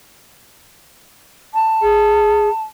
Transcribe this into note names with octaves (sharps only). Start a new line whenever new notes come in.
A5
G#4